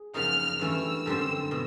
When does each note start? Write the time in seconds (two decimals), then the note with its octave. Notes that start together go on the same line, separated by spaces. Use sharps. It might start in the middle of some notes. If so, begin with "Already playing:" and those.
Already playing: G#4
0.14 F#2 C#3 F3 A#3 D#4 F6
0.60 G2 E3 A3 C#4 E4 E6
1.06 F#2 D3 G3 C4
1.51 B2